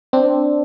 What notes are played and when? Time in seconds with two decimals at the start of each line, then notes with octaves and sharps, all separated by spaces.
0.13 C4 D4